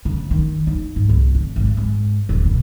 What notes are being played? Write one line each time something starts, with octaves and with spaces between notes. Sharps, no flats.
C#3
D#3
D#4
G#2
C2
D3
G#1
G#2
D#1
B2